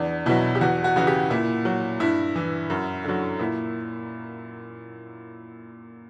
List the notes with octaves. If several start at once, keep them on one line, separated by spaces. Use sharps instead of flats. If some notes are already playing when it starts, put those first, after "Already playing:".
Already playing: E2 D4
B2 F#3 E4
G4
E2 F#4
F#4
C#3 E3 F#4
G4
A#2 E4
F#3
G2 E4
E3
F#2
D3 F#3
A#2 E4